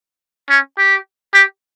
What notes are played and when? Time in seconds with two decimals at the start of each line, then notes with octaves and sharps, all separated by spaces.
0.50 C#4
0.78 G4
1.34 G4